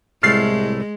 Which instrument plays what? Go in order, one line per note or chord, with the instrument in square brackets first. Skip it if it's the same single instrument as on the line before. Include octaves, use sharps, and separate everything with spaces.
[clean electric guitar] C2 A2 A3 [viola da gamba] G#3 [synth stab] F6 A6 C7